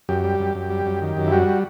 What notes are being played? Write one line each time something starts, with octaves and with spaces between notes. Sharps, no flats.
F#2 G4
G3
F#2
F#2
G3
F#2
D#3
F#2
E4
G3 F#4